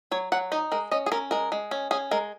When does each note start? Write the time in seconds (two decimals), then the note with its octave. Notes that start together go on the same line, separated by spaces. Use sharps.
0.11 F#3 C#5
0.32 F#3 F#5
0.52 D#4 D#5
0.72 G#3 A#4
0.91 C#4 D#5
1.06 G#4
1.12 C#4 A#4
1.31 G#3 A#4
1.52 G#3
1.71 C#4
1.91 C#4 G#4
2.11 G#3 A#4